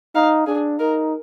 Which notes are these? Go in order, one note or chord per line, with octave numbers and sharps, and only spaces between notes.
D#4 F5
D4 G#4
D#4 A#4